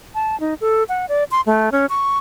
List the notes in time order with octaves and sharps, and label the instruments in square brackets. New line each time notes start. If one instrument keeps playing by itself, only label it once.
[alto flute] A5
D#4
A4
F#5
D5
C6
A3
C#4
C#6